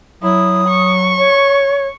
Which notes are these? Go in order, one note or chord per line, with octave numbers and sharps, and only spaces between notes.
F#3 E4 D#6
C#6
C#5